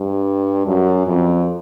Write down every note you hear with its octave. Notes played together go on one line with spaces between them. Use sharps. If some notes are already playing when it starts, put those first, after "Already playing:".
Already playing: G2
F#2
F2